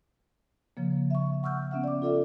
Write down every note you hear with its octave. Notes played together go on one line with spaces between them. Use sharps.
C#3 F3 A#3
E5 C#6
F#5 C#6 E6 F6 G6
B3 C#4 E5 F#5
D5 D6
F4 A4 D5 E5